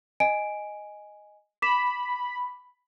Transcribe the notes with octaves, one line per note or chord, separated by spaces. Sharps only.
D#5 G#5 D7
B5 D6 B6 E7